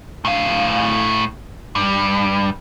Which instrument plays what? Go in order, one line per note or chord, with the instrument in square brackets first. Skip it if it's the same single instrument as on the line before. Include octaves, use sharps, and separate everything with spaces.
[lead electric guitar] A2 F5
G2